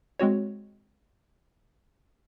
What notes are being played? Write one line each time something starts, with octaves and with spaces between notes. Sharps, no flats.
G#3 C4 F#4 C#5